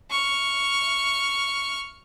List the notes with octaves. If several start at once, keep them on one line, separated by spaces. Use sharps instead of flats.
C#6 F6